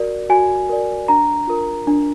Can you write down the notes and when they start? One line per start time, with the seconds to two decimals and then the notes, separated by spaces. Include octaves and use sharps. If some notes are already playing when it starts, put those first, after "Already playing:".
Already playing: F#4 A#4 D5
0.29 F#4 G#5
0.70 A#4 D5
1.08 D4 A#5
1.47 F4 A#4
1.87 D4